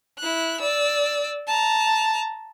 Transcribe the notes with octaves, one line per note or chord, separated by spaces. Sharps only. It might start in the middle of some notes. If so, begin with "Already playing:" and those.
E4 F#6
D5 E6
A5 A#5